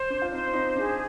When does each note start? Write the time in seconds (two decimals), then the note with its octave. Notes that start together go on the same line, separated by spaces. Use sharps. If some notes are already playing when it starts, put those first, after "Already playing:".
Already playing: C5
0.10 D4
0.22 F4
0.31 C4 D#4 C5
0.53 C4 D#4
0.76 D4 G#4